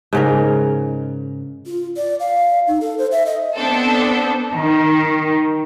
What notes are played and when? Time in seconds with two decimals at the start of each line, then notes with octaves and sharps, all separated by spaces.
0.13 G#2 C#3 A#4
1.66 F4
1.97 D5
2.20 F5
2.67 D#4
2.81 A4
2.98 C5
3.11 E5
3.26 D#5
3.56 B3 C4 D4 A4
4.53 D#3